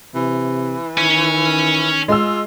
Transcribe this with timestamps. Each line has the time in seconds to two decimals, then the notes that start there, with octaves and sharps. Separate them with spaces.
0.15 C3 E3
0.98 D#3 C#5 G#5
2.08 G#3 F4 E6